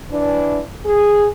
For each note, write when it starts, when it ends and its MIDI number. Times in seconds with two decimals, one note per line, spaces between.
0.10 0.59 52
0.10 0.59 62
0.84 1.25 68